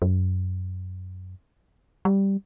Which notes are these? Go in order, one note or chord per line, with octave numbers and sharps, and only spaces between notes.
F#2
G3